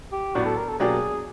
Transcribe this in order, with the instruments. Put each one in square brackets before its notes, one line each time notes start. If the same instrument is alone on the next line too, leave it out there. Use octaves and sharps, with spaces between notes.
[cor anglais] G4
[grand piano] A2 F#3 B3 D4 [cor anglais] F#4
[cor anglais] A4
A#4
A4
[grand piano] B2 F#3 A#3 D4 G4 [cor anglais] G#4